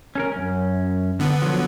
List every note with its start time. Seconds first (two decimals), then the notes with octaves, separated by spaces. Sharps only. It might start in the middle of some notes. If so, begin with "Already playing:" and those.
0.15 C#4 A4 A#4
0.32 F#2 C#4
1.19 D3 B3
1.42 F3 F#3